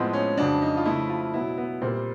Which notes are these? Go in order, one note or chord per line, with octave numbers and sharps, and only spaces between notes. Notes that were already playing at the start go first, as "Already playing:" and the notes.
Already playing: A2 F3 G#3 B3 C4
C#4
F2 C#3 F#3 D4
D#4
F4
C#3 F3 A3 E4
F4
B2 F#3 B3 E4
B3
A#2 G3 A#3 C4